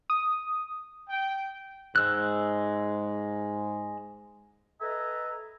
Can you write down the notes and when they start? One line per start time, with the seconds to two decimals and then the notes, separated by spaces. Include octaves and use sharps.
0.10 D#6
1.09 G5
1.96 G#2 G#3 E6 F#6
4.81 A4 B4 D#5 E5 G#5 A#5